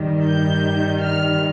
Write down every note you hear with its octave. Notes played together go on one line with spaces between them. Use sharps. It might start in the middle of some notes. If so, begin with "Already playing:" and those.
Already playing: G2 D#3 G3
G6
F6